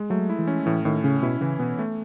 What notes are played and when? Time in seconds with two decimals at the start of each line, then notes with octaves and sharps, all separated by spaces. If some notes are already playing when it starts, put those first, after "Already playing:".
Already playing: G#3
0.10 F#3 A3
0.29 E4
0.39 E3
0.47 C#4
0.66 A2 E3
0.85 A2 D#3
1.04 C#3 C#4
1.23 B2 E4
1.41 C#3 E3
1.59 B2 B3
1.79 A3